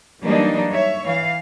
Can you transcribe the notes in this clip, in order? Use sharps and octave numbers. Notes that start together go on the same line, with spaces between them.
E3 F#3 G3 A#3 D4 D#4
C#5 E5
E3 F5